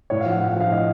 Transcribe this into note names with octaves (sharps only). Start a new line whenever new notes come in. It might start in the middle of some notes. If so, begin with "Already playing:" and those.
A2 C#5
F5
F3 F#5
A2 F#5
F#5
F3 F5
A2 D#5